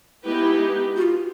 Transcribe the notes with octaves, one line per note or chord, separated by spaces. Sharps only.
G#3 B3 D#4 E4 G4 B4
F#4
F4